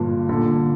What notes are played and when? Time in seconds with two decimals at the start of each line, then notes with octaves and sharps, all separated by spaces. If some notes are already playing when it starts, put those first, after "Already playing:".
Already playing: G1 G2 A#2
0.29 A#2 D3